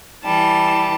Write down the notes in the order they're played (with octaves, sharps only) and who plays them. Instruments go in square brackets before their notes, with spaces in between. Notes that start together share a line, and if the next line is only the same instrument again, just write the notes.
[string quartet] E3 G3 A5